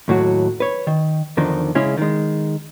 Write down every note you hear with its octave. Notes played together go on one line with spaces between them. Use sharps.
D#2 A2 F#3 F#4
B4 C#5
D#3
E2 D3 D#3 F3 D#4
C#3 G#3 C#4 E4 G#4
D#3 G#3